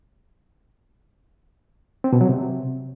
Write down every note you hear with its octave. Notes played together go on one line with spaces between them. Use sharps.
C4
B2
F#3
C3